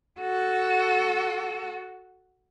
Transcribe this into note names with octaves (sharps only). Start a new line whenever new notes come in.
F#4 A4